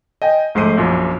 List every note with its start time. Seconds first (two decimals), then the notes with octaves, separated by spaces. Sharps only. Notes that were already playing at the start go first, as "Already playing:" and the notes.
0.22 D#5 G5 G#5
0.55 A#1 G#2 A3 C5 C7 D#7
0.77 A#1 F#2 A#2